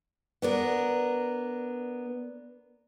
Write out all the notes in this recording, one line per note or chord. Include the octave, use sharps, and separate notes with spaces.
B3 D4 A#4